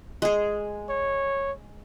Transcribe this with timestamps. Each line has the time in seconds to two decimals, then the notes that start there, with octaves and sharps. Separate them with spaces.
0.22 G#3 G#4
0.89 C#5